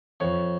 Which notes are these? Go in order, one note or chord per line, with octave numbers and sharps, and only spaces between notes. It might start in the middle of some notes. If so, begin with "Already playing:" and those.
F2 C#5